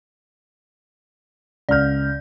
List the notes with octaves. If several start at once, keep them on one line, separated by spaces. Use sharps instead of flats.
C#2 D5 F6 G6